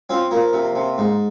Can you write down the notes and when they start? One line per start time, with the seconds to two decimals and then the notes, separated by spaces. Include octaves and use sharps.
0.10 F3 C4
0.31 F3 A#3
0.53 C3
0.75 C3
0.98 G#2